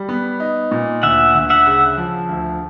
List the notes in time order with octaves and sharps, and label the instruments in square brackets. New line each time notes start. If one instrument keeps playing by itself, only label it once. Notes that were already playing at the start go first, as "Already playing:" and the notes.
Already playing: [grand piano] G3
B3
D#4
A#2
[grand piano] D2 [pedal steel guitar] E5 F#5
[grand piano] D2
[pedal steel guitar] E5 F#5
[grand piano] C#3
F3
D2